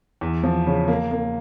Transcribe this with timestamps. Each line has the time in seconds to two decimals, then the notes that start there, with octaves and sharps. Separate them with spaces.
0.21 E2
0.43 F3
0.67 C#3
0.88 A#3
1.11 A#3